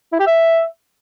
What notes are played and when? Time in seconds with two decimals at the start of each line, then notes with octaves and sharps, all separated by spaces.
0.12 E4
0.20 G4
0.27 E5